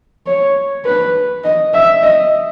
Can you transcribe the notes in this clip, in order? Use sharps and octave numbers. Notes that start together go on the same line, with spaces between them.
C#5
B4
D#5
E5
D#5